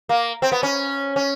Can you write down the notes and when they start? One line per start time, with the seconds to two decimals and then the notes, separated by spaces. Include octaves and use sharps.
0.09 A#3
0.42 C4
0.52 B3
0.63 C#4
1.16 C#4